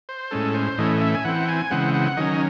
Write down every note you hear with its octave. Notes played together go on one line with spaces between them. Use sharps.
C5
A2 G#3 C#4 A4
C5
A2 E3 A3 C#4 D#5
D#5
E5
G#5
E3 C4 F#5
G#5
C#3 E3 G#3 C4 F#5
F#5
D#3 F#3 C#4 D#5